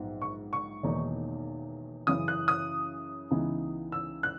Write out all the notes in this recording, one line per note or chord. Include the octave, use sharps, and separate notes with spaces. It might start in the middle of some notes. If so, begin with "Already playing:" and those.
Already playing: A#1 G#2 F#3 B3 D#4
C#6
C#6
E1 E2 D#3 A#3 D#4
F#2 C#3 E3 D#6
F#6
D#6
C#2 C#3 E3 B3 D#4
E6
F#6